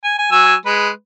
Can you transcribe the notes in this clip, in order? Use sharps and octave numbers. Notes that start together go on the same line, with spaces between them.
G#5
G#5
F#3 G#5 E6
G#3 B4